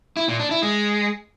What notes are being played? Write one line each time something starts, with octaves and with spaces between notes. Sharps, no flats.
E4
A#2
D4
E4
G#3